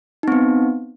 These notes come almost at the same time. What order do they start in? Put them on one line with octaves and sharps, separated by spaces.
D#4 C4 B3